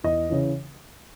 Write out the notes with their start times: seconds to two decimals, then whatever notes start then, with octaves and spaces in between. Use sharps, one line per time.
0.04 E2 D#5
0.30 C#3 E3